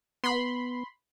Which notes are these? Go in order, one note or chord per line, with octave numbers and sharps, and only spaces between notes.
B3 B5 C6